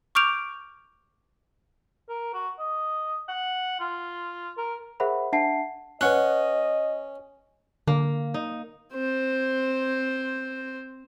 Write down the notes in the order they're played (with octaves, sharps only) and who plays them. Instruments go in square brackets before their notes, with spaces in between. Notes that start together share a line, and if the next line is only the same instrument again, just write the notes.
[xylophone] C#6 D6 F6 G6 D7 F7
[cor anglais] A#4
F#4
D#5
F#5
F4
A#4
[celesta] G#4 A#4 C5 E5 F#5 B5
D4 E5 F#5 A5 C7
[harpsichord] C#4 [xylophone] B4 F#5 F#6 [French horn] D#5
[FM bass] D3 [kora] A#3
[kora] D#4
[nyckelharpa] C4 C5